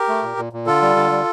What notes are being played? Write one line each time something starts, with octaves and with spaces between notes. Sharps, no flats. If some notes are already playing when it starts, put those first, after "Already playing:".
Already playing: G4 A#4
A3
A#2
A#2
A#2
D3 F4 A4
G3
D3
G3